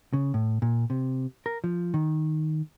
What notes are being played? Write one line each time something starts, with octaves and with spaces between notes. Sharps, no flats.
C#3
A2
A#2
C3
A#4
F3
D#3